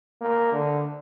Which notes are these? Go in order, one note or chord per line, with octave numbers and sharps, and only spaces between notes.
A#3
D3